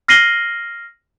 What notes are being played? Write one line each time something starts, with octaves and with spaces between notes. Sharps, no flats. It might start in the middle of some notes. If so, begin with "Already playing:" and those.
F6 A#6 C7 D#7 F#7 G7